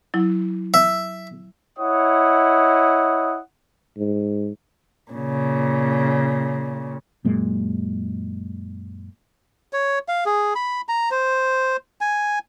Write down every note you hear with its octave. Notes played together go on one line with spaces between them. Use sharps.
F#3 E4
E5
E4 C#5 D#5 F#5 D#6
G#2
A#2 C#3
F#2 A#2 G#3
C#5
F5
G#4
B5
A#5
C5
G#5